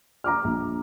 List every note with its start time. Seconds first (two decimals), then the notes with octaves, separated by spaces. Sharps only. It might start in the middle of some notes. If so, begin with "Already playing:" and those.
0.24 A#5 D6 F6
0.44 A#1